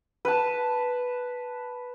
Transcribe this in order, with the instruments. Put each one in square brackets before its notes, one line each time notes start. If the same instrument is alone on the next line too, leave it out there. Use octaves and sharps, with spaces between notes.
[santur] B4 A5